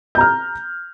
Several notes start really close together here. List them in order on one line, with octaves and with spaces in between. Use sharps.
G6 A#5 F6